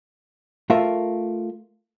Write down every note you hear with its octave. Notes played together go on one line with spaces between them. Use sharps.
A3 F4 A#4 E5